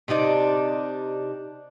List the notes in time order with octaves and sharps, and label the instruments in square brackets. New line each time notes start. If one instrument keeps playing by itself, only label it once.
[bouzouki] C3 D4 D#4 D5